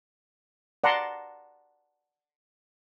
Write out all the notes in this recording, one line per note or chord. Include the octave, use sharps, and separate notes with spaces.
D5 F#5 A5 A#5 C6